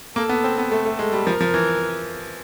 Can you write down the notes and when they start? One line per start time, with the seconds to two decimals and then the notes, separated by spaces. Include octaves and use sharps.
0.16 A#3 A4
0.29 B3
0.44 C4
0.58 B3
0.71 A3 A4
0.85 A3
0.99 G#3
1.12 G3
1.26 F3 A#4
1.40 F3
1.54 E3